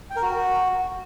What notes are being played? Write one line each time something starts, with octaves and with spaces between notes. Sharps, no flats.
G5
A#4
F#4